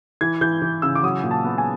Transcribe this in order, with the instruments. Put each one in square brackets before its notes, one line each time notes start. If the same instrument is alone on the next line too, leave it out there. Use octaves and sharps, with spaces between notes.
[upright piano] E3 G#6
E3 G6
E3
C#3 E6
D6
F#3 D#6
A#2
A5
B3
G#5